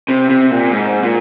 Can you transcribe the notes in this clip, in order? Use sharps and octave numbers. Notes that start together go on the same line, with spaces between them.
C3
C3
A#2
G#2
A#2